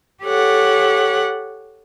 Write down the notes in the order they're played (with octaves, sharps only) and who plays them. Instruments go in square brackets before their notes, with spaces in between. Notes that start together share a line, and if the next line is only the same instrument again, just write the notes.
[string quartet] G4 A4 C#5 F#5